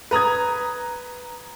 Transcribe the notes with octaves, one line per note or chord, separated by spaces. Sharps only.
B4 A#5 D#6 G#6